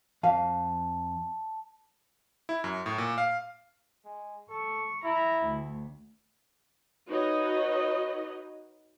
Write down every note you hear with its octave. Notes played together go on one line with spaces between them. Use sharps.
F2 F5 A5
E4
F#2
A2
A#2
F5
G#3
A4 C#6
E4 A#5
D2
D#4 F#4 B4 C#5 D#5